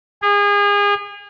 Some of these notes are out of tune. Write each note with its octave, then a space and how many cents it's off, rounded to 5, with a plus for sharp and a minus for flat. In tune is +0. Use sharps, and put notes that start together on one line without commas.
G#4 -30